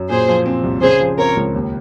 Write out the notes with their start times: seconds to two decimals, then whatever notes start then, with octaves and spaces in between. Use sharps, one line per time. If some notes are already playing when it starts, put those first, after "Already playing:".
Already playing: F#2
0.10 A#2 G#4 C5
0.28 F3
0.46 C4
0.64 C2
0.82 C#3 G#4 C5
1.00 F3
1.18 C4 A#4 C#5
1.37 C#2
1.55 D#2